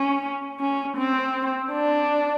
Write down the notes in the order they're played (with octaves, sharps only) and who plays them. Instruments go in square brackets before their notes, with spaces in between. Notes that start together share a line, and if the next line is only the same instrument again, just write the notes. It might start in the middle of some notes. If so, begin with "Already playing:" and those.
Already playing: [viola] C#4
C#4
C4
D4